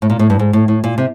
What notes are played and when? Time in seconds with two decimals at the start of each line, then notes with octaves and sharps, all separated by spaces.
0.02 A2
0.10 A#2
0.19 A2
0.30 G2
0.39 G#2
0.53 A2
0.68 A2
0.84 A#2
0.98 C3